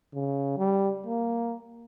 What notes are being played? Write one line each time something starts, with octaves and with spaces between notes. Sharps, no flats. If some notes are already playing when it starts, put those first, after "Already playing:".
C#3
G3
A#3